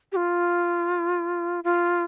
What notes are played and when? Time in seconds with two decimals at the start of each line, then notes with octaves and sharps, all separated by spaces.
0.12 G4
0.16 F4
1.64 F4